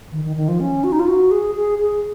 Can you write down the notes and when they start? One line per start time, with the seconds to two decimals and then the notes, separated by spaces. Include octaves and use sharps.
0.12 D#3
0.24 D#3
0.36 D#3
0.48 F3
0.60 C#4
0.84 F#4
0.92 D#4
1.00 F4
1.08 F#4
1.31 G#4
1.55 G#4
1.78 G#4